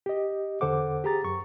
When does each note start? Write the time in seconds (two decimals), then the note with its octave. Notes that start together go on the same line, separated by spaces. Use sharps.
0.06 G4 D#5
0.61 E2 D3 A4 C5 F#5 D6
1.04 G4 G#4 A#5 A6
1.24 F#2 C#6